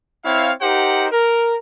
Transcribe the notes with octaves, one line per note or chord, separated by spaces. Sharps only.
C4 E4 C#5 F5
D#4 G4 A#4 C5 F#5
A#4